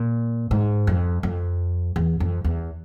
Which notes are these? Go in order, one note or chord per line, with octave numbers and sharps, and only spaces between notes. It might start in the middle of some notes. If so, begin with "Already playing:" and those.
Already playing: A#2
G#2
F2
F2
E2
F2
E2